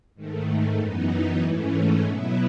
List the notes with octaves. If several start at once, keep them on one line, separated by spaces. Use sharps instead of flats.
G#2 D#3 A3
F#2 E3 B3 D#4
G#2 E3 A3 C#4
B2 F#3 B3 E4